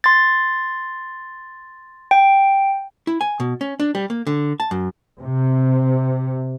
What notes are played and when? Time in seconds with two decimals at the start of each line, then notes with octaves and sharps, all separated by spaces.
0.04 C6 A6
2.11 G5
3.07 E4
3.21 G#5
3.40 B2
3.61 C#4
3.80 D4
3.95 G3
4.10 A#3
4.27 D3
4.60 A5
4.71 F#2
5.20 C3